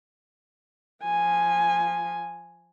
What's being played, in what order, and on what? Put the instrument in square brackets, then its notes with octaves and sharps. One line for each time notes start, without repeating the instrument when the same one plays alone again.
[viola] F3 G#5